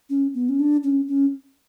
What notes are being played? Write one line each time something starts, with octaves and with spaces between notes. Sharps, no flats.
C#4
B3
C#4
D4
C#4
C#4